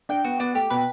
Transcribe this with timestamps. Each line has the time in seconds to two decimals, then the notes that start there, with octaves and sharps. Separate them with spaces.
0.09 D4 G5
0.24 B3 F#4
0.40 B3 D4
0.55 A3 G4
0.70 B2 B4